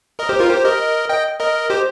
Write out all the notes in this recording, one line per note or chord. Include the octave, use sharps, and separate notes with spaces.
A#4 D#5
G4 C5
F4 A#4
G4 C5
A#4 D#5
D#5 G5
A#4 D#5
G4 C5